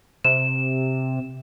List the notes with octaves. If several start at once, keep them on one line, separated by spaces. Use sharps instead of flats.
C3 E7